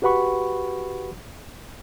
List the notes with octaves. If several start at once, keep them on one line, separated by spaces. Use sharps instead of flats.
F#4 G4 B4 F#5 B5 C#6